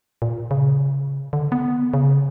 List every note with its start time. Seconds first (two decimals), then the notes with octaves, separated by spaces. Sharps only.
0.22 A#2
0.51 C#3
1.33 D3
1.52 B3
1.94 C#3